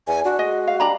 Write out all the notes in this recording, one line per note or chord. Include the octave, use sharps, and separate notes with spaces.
E2 G#5
D4 F#4
G#3 D#5
F5
G3 D4 A#5 B5